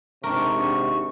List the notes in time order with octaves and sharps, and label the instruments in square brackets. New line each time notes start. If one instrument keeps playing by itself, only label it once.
[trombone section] G#1 G#2 C3 [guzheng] D4 A#4 [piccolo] C#6